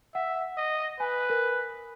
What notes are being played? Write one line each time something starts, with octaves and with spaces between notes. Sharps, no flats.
E5 F#5
D#5
B4 G#5
A#4